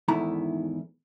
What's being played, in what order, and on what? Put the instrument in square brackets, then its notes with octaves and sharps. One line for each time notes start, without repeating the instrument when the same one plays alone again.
[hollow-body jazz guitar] E2 G#2 D#3 A3 E4 A#5